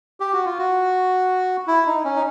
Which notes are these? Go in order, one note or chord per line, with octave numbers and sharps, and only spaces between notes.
G4
F#4
F4
F#4
E4
D#4
C#4
D#4